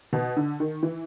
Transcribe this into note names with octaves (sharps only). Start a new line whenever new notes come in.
B2
D3
D#3
E3